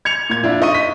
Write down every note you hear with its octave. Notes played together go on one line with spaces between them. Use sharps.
G#6 C#7 F7
A#2 G#6
F3 D4 E4 F4
D#4 D#5 C#6 D#7
B6